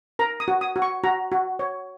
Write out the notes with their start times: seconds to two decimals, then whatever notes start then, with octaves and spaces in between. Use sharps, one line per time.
0.19 A#4 A#5
0.40 D#6
0.48 F#4
0.61 D#6
0.76 F#4
0.82 C#6
1.03 F#4 A#5
1.32 F#4
1.59 C#5